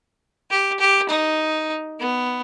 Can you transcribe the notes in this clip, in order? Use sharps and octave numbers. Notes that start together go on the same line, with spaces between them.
G4
G4
D#4
B3